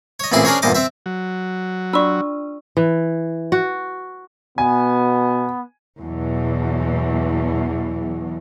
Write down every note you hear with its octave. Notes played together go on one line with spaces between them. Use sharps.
C#5 D#5
A1 A#2 C4 E4 G#4 C6
C#4 D4 G#4 A#4 C5 C#5
E2 G2 A#2 C5 D#5 D6
C4 C5 E5
F#3
D4 F4 F#4 D5 C#6 E6
E3
F#4
B2 B3 G#5
E2 B2 E3 F#3